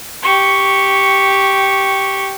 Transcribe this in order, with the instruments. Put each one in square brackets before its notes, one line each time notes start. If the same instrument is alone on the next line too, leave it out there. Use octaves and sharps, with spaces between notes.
[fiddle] G4 C#6